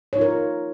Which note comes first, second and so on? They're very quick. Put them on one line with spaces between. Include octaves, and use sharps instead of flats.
C#5 D#4 F4 A#4